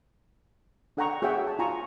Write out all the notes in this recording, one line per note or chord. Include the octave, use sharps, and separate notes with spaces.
D4 A4 F#5 G5 A#5 C#6
F#4 G#4 C#5 E5 F#5 G5
A5
F4 G#5 A#5 C#6